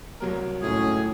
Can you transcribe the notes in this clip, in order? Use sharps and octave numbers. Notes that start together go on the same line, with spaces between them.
C2 F#3 A#4
C#2 A2 C#4 G#4